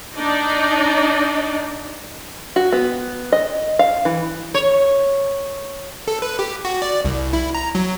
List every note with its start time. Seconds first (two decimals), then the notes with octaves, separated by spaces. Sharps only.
0.15 D4 D#4 D5 D#5
2.56 F#4
2.72 B3
3.32 D#5
3.79 F5
4.05 E3
4.54 C#5
6.08 A4
6.22 B4
6.39 G4
6.65 F#4
6.82 D5
7.05 C2
7.33 E4
7.55 A#5
7.75 F#3